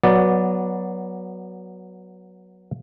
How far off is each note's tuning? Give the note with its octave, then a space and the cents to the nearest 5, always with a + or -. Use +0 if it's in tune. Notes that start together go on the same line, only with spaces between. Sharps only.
F#3 +0 B3 -20 D5 +0